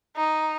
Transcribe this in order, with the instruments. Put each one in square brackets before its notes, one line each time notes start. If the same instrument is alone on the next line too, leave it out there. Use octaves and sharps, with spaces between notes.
[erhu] D#4